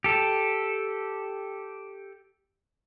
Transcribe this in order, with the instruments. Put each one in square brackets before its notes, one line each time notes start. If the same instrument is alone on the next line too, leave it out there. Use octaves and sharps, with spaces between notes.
[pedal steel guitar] G4 A4